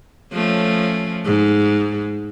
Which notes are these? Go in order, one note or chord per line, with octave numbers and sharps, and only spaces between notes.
F3 A3 C#4
G#2